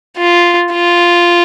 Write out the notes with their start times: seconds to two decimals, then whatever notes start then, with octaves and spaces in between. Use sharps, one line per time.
0.17 F4
0.72 F4